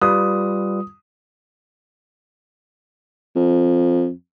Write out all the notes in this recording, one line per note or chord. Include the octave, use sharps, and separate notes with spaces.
G3 F4 B4 D#6
F2